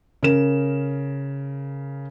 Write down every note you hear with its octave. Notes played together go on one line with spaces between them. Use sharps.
C#3 A#4 E7